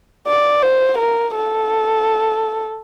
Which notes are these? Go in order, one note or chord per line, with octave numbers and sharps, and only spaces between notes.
D5
C5
A#4
A4